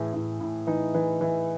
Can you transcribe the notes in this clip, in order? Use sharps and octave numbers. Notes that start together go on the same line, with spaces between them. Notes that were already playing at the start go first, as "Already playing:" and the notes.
Already playing: A2 E3 G#4
A2
A2
E3 D#4
E3
E3